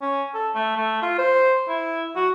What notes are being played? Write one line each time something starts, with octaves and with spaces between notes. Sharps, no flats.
C#4
A4
A3
A3
F4
C5
E4
F#4